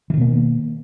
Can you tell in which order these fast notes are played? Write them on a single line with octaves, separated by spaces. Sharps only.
E3 D#3 B2 A#3